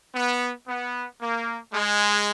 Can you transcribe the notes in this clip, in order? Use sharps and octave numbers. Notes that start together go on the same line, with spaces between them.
B3
B3
A#3
G#3